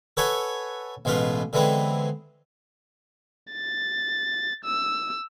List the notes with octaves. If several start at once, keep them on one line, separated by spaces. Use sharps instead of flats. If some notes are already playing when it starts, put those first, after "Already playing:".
A4 B4 C#5 E5 F#5 G#5
A1 B2 G#3 F4 B4
D3 E3 G#3 B3 C4
A6
E6